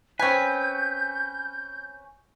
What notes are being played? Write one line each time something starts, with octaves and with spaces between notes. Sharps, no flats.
C4 C#4 B4 G#5 G6